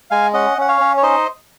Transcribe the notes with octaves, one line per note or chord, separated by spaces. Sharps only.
G#3 F5 G#5
C#4 D#5 F#5
C#4 F#5
C#5 F5
C#4
C#5
D#4 C5 D#5